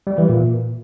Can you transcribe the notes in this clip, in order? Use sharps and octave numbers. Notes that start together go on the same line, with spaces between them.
G3
E3
A#2